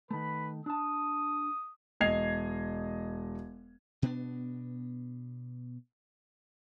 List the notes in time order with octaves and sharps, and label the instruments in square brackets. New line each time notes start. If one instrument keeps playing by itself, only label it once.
[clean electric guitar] D#3 A3 [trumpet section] B4 B5
[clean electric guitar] D4 A5 [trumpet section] D#6
[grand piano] E1 D#5 G#6 C7 F7
[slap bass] B2 B3 D4